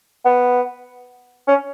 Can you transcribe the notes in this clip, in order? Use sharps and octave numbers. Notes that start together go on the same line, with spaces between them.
B3
C#4